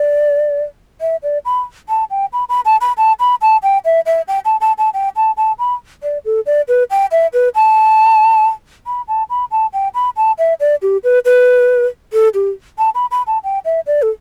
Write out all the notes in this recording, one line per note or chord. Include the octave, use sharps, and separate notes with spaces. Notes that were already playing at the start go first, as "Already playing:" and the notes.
Already playing: D5
E5
D5
B5
A5
G5
B5
B5
A5
B5
A5
B5
A5
G5
E5
E5
G5
A5
A5
A5
G5
A5
A5
B5
D5
A4
D5
B4
G5
E5
B4
A5
B5
A5
B5
A5
G5
B5
A5
E5
D5
G4
B4
B4
A4
G4
A5
B5
B5
A5
G5
E5
D5
A4